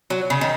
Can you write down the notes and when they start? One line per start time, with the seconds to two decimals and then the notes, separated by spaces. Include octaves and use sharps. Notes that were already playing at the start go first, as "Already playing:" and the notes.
0.10 F#3
0.30 C#3
0.41 D#3